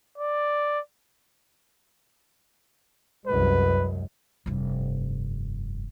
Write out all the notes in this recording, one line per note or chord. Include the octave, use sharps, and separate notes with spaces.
D5
C2 F#2 G#3 B4
F1 G2